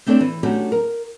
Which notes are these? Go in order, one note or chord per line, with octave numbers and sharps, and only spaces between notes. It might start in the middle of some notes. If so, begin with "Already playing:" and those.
A3 C4 D4 A4 C#5 D5
E3
F#3 A3 C#4 D4 F#4 G4
A#4